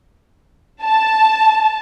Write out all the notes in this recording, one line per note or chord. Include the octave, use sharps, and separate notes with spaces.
A5